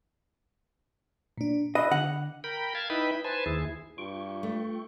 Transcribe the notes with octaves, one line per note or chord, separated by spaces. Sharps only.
A#2 D4
D#5 B5 E6 F#6
D3 F#5
A#4 G5 B5
F5 A5 G#6
D#4 E4 B4 G5 B5
B4 C5 G#5 A5
D#2 E4 G#4
G2 F4 G5 C#6
A3